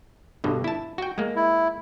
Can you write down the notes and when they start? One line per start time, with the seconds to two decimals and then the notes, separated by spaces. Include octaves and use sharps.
0.44 G2 B2 D3
0.64 E4 A5
0.98 F#4 G5
1.18 G#3 A#3
1.36 E4